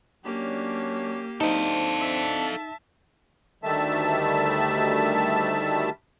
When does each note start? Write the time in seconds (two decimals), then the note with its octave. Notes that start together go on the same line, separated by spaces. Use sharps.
0.25 F#3 A#3 C#4 D4 G4
1.41 C4 D4 D#4 A4 F5
2.00 E5 A5
3.64 D2 D#3 G3 A3 E5 A5